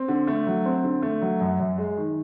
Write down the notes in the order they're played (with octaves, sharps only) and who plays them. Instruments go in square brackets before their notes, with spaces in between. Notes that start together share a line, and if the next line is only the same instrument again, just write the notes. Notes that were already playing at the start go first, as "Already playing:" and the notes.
Already playing: [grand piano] C4
D3
A3
F#3
C4
D3
A3
F#3
F#2
F#2
G#3
D#3